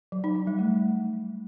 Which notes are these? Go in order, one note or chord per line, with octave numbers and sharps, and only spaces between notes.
F#3
D#4
F#3
G3
A3